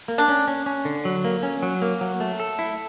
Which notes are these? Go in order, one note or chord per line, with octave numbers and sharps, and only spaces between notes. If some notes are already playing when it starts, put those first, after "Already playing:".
A#3
D4
C#4
C#4
C#4
D3
F#3
A#3
C#4
F#3
A#3
F#3
A3
A4
E4